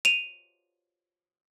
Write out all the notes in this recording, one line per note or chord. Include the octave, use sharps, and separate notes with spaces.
D#7 F7